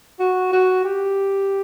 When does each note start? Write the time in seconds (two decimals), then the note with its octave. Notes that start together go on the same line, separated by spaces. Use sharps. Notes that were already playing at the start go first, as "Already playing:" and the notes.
0.19 F#4
0.52 F#4
0.84 G4